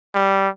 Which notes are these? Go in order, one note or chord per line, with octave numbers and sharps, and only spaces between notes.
G3